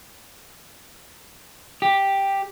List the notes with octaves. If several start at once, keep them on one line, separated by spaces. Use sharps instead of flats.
G4